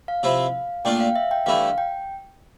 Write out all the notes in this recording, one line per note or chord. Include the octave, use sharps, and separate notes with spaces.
F5
C3 F3 C4 E4
A#2 A3 D4 F4 G5
F5
E5
G5
G2 E3 A3 E4 F5
G5